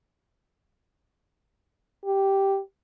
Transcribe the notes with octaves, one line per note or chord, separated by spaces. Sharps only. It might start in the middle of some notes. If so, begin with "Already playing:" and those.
G4